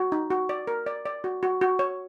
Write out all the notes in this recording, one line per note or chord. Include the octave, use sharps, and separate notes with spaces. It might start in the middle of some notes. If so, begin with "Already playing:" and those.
Already playing: F#4
D#4
F#4
D5
A#4
D5
D5
F#4
F#4
F#4
C#5